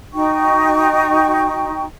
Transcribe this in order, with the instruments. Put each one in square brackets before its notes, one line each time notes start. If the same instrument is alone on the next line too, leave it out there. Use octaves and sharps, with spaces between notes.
[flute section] D#4 F#4 G5 C#6